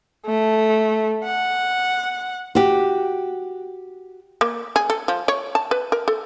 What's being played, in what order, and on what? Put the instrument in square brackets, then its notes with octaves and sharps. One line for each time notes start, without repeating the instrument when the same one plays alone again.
[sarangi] A3
F#5
[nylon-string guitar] F#4 G4
[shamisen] A#3
G#4
A4
F3
C#5
A5
B4
A#4
A4